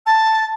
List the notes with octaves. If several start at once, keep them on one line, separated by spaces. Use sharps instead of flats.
A5